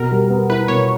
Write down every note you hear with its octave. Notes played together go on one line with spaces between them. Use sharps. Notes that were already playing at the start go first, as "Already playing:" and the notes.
Already playing: B2 A#4
G3
B3
E4 B4
B2 C#5